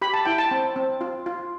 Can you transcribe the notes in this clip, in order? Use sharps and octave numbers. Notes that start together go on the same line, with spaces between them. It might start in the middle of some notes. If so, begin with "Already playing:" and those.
G4 B5
A5
E4 G5
A5
C4
C4
F4
F4